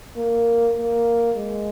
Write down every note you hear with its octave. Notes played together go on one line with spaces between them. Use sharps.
A#3
A#3
G#3